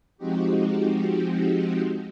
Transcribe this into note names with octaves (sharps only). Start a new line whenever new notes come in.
F3 G#3 C4 D#4 F#4 G4